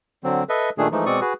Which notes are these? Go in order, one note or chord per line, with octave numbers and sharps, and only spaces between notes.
D3 F#3 C4
A4 B4 D#5 E5
A#2 D#3 A3 D4 G#4
E3 F3 G#3 A3 D#4
B2 G#3 C4 D5 C#6 D#6
F#4 G#4 B4